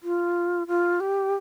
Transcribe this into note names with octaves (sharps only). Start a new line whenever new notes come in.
F4
F4
G4